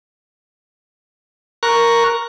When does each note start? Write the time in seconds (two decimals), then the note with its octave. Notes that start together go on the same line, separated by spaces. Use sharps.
1.63 A#4 A#5 C#6 F#6